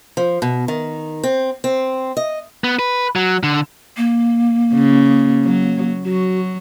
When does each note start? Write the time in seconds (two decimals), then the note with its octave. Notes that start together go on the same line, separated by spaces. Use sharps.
0.17 F3
0.42 B2
0.68 D#3
1.23 C4
1.64 C4
2.17 D#5
2.64 B3
2.79 B4
3.16 F#3
3.43 D3
3.97 A#3
4.73 C#3
5.45 F#3
6.05 F#3 F#4